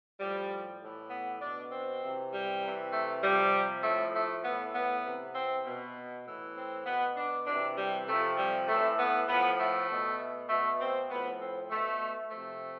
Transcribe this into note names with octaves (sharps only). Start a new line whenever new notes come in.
A2 F3 G3
A2 E3
B3
B2 D4
C4
C3 E3
G3
C3 E3
A3
C3 F3 G3
A2 F3 A3
A3
A2 E3 B3
B3
C3 E3
C4
B2
A2 E3
C4
B2 B3
D4
C3 E3 D4
G3
C3 F3 A3
G3
A2 E3 A3
B3
A2 F3 B3
A3
B2
B2 A3
C4
A2 F3 B3
C4
B2 A3
C3 F3 A3